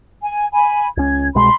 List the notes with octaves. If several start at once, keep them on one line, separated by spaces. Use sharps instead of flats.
G#5
G#5 B5
C#2 C#4 G#6
C2 B2 G#3 B5 C6